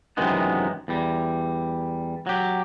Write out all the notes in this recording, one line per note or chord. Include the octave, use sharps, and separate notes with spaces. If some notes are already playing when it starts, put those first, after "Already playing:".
F#2 C3 D#3 E3 G#3 B3
E2 G3
F#3 G4